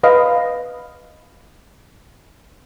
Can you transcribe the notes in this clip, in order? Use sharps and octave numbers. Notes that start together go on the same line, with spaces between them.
B4 D#5 F5